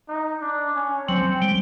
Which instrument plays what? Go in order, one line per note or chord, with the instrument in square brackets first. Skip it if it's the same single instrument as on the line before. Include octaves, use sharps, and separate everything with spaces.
[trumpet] D#4
D4
C#4
[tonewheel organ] F#3 [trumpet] C4
[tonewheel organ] G3